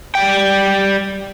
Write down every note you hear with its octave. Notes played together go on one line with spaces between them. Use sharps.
G3 G5